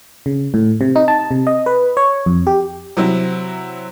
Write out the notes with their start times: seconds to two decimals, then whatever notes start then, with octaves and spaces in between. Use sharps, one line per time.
0.26 C#3
0.54 A2
0.81 C3
0.96 D#4
1.08 A5
1.31 C3
1.47 D#5
1.66 B4
1.97 C#5
2.26 F2
2.47 G4
2.97 C3 F#3 C4 E4